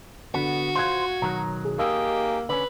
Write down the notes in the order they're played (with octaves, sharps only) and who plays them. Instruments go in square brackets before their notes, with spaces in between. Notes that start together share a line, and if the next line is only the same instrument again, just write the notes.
[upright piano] D3 [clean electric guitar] B3 [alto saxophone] F#4
[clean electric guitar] F4 C5 [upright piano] F5 F#6 G#6
[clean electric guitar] B1 D#3 F#3 [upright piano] A#5
[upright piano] G#4
[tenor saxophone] A#3 [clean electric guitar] D#4 G#4 [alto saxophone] G4 [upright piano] E6
[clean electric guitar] D3 C#4 [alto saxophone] B4